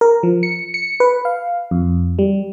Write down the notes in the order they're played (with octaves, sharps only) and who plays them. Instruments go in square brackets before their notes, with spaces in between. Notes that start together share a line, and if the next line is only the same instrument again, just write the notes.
[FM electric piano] A#4
F3
C#7
C#7
B4
F5
F2
G3